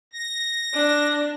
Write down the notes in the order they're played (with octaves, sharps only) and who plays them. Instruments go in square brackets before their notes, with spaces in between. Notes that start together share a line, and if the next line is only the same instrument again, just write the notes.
[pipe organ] A#6
[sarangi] D4